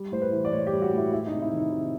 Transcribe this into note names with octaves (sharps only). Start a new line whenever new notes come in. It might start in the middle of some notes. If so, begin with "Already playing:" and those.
Already playing: G3
A2 C5
B4
E3
D5
A2 C#5
G4
G3
F#4
A2
E4
G#3 E4
D#4
C3
E4
D#3
D#4
C3 D#4